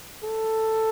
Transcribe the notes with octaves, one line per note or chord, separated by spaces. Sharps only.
A4